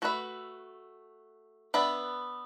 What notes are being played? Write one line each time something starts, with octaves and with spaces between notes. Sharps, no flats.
A3 F#4 B4 E5
B3 D4 B4 E5